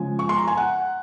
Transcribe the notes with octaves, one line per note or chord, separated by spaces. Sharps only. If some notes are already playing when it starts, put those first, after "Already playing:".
Already playing: C#3 F3 G#3 G#5
C#6
C6
A#5
G#5
F#5